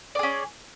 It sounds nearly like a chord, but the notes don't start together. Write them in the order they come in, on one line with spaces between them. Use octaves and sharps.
D5 G#4 C#4